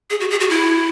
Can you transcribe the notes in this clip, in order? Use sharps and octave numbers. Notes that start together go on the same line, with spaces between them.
G#4
F#4
G#4
F#4
E4